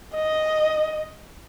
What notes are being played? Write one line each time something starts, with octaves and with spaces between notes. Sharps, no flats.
D#5